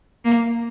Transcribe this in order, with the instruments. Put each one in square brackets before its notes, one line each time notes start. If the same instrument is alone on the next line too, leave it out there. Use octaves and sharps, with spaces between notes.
[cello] A#3